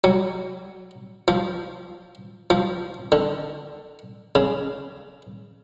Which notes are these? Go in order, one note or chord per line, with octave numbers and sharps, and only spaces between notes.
F#3
F3
F3
D3
C#3